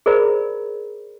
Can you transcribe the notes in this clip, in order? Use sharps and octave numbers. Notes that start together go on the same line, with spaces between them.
G#4 A#4 C5 D5 A#5 B5